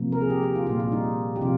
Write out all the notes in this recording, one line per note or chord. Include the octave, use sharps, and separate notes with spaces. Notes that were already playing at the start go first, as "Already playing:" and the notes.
Already playing: C3 F3 A#3
A#4
G#4
G4
G4
F4
A#2 G3 A#3 F4
F4
D#4
G4
C3 F3 F4